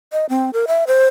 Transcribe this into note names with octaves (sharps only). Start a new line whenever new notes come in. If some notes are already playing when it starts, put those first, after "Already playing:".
D#5
C4
A#4
E5
C5